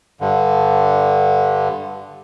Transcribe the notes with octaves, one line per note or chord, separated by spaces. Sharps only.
G2 D3